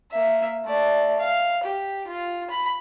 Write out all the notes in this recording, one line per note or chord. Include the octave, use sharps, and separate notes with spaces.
A#3 E5
A3 D5
F5
G4
F4
B5